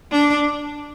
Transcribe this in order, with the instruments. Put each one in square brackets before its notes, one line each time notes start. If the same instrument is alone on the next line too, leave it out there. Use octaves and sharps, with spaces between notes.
[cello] D4